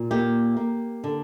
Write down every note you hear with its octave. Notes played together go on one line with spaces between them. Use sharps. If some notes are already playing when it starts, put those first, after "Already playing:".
Already playing: A#2
A#3 G4
A#3
D3